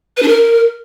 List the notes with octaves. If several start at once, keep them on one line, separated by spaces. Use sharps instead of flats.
B4
D4
A#4